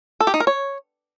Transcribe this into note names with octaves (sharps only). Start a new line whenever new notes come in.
A4
G4
D#4
A#4
C#5